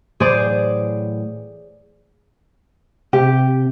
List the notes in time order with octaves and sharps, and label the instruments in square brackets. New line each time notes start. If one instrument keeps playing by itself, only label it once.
[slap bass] A2 E3 F#3 [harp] G#4 C5 D5
[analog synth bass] C3 [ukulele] G4